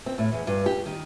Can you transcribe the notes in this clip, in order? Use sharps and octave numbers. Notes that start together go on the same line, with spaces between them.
C4
A2
E2
G2
G4
D#3